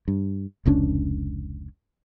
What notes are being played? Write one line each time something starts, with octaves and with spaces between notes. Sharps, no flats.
G2
F1 C#2 C#4 D4